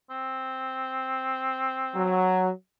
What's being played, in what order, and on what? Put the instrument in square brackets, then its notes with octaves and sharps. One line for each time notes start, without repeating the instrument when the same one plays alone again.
[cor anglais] C4
[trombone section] F#3